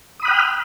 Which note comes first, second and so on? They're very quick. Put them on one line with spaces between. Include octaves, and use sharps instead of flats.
D#6 B5 F#6 G5 F6